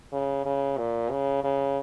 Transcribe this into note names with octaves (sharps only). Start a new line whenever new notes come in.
C#3
C#3
A#2
C#3
C#3